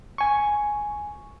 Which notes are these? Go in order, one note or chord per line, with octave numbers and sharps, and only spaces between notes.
G#5 C#6